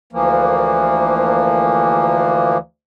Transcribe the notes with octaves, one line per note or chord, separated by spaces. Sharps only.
D2 E3 F3 A#3